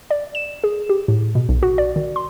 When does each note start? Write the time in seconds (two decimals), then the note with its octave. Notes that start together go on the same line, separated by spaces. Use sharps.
0.10 D5
0.35 E7
0.64 G#4
0.89 G4
1.08 A2
1.35 B2
1.49 B1
1.63 F#4
1.78 D5
1.96 D#3
2.16 C6